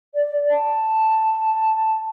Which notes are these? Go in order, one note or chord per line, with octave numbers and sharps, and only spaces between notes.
D5
A5